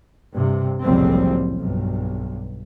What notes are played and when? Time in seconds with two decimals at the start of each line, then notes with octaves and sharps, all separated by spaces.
0.35 G2 C3
0.83 F#1 C2 F2 A2 G3 C4
1.58 B1 G2